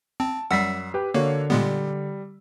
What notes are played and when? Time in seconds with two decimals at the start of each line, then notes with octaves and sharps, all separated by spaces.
0.20 C4 A5
0.51 F#2 G3 F#5 E6 B6 C7
0.94 G4 B4 G5
1.14 D3 A#3 F#4 A#4 C#5
1.50 A#2 G3 G#3 B3